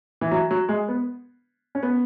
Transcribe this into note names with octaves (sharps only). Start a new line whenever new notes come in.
E3
F#3
F#3
G#3
B3
C#4
B3